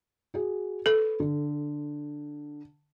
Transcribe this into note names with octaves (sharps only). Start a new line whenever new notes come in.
F#4 G#4
A4 B4
D3